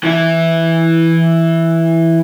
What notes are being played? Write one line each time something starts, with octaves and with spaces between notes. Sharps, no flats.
E3 E4